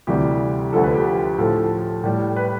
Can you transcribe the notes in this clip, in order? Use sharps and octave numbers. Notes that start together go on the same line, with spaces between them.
D2 C3 E3 G3 G4
D2 D3 F3 A4
B4
G4
A2 F3 A4
A2 G3
B4